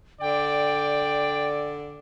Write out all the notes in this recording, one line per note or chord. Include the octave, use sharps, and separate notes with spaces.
D3 D5 G5